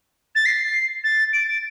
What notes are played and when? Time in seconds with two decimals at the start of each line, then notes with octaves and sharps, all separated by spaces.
0.35 A6
0.45 C7
1.04 A6
1.33 D7
1.47 A6